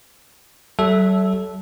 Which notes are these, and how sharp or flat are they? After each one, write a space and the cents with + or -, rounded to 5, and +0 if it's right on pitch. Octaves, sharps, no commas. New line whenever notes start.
F#3 +45 A4 -15 E5 +0